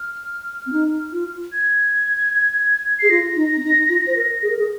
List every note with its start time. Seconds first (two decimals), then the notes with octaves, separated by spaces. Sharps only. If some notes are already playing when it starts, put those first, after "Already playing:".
Already playing: F6
0.66 C4
0.73 D#4
1.13 F4
1.52 G#6
2.99 G#4 C7
3.10 F4 A#6
3.36 D#4
3.56 C4
3.63 D#4
3.89 F4
4.07 C5
4.16 A#4
4.43 G#4
4.50 A#4
4.59 G#4